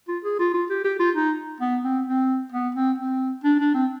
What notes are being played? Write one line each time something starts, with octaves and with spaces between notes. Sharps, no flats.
F4
G#4
F4
F4
G4
G4
F4
D#4
B3
C4
C4
B3
C4
C4
D4
D4
C4